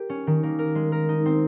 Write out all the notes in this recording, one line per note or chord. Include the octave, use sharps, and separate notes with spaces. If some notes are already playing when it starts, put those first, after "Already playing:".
Already playing: G4 A#4
C#4
D#3
A#3
A#4
G#3
A#4
D#4
C4